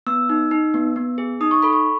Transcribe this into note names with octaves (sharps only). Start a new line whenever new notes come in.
B3 E6
D#4
D#4
B3
B3
G#4
D#4 D#6
C#6
A4 B5
C#6